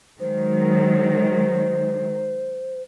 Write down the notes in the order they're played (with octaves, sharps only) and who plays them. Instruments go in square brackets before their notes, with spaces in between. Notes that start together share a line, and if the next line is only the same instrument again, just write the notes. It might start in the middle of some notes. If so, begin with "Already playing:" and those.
[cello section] D#3 F#3 G#3 [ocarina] C5